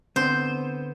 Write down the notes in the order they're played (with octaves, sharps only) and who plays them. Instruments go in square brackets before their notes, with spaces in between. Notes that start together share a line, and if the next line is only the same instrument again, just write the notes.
[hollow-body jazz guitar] D3 B3 C4 [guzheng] C5